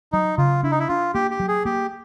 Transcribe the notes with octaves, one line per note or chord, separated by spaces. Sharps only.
F#3 D#4
C#3 F4
D4 E4
D#4
E4
D4 F4
A#3 G4
G4
F#3
G#4
A#3 G4